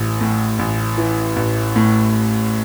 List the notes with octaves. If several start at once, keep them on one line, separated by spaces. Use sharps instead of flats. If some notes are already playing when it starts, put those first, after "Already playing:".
Already playing: A1 E3
A2
A1
E3
A1
A2